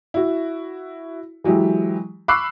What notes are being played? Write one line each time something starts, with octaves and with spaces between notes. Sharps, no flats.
E4 F#4
E3 F#3 G#3 E4 G4
B5 C#6 D6 E6 F#6 C7